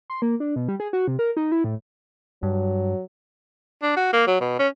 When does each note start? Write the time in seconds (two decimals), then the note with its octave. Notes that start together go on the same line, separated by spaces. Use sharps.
0.10 C6
0.22 A#3
0.40 D4
0.56 B2
0.68 G3
0.80 G#4
0.93 F#4
1.08 C3
1.19 A#4
1.37 D#4
1.52 E4
1.64 A2
2.43 G2 F#3
3.83 D4
3.97 F#4
4.13 A#3
4.27 F#3
4.41 B2
4.59 C#4